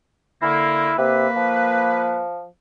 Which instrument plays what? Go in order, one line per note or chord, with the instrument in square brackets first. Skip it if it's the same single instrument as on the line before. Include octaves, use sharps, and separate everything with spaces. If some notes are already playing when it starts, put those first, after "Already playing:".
[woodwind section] D3 A#3 [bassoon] E4
[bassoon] C3 [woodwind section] A#3 B4
[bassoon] F3